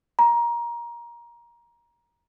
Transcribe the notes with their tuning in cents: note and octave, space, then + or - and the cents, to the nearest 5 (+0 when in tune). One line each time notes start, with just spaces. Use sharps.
A#5 +20